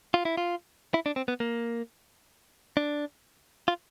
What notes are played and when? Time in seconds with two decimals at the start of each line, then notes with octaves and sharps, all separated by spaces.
0.14 F4
0.25 E4
0.37 F4
0.94 E4
1.06 D4
1.16 C4
1.28 B3
1.40 A#3
2.77 D4
3.68 F4